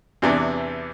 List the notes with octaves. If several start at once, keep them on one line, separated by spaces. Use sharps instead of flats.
E2 C3 E3 B3 D4